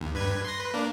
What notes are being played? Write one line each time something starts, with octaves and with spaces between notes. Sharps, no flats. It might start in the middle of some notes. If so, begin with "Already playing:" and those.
D#2
G2 B4 G#6
C6 A#6
B4
A#3 D4